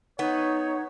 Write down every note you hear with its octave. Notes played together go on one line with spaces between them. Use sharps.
B3 D#4 C#5